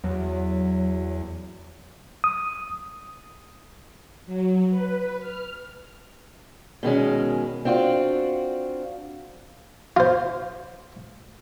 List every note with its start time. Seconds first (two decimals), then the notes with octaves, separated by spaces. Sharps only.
0.04 E2 F#3
2.24 D#6
4.26 F#3
4.70 B4
5.20 F6
6.83 B2 D#3 G#3 C#4
7.65 C4 D4 F4 F#4
9.97 F4 C5